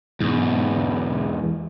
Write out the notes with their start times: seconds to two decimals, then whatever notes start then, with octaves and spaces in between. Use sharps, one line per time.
0.20 E2 G#2